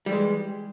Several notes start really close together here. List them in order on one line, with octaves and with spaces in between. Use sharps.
G3 E3 G#3